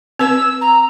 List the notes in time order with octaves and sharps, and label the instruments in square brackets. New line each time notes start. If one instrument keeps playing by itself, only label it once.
[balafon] C4 B4 [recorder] E6
[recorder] A#5